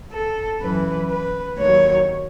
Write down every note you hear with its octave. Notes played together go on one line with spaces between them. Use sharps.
A4
F#2 E3 B4
B4
D#2 D#3 F#3 C#5